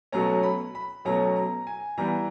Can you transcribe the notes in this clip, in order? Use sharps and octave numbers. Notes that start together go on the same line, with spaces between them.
B2 F#3 A3 C#4 A#5
B5
B5
B2 F#3 A3 C#4 A#5
A#5
G#5
E3 G3 B3 A#5